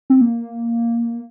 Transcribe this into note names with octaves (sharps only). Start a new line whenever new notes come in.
C4
A#3